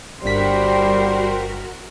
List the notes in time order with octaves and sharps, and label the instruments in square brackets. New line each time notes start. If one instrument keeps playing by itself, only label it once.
[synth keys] G1 G2 B6 [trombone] G3 [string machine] F#4 A#4 [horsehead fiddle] C5 G5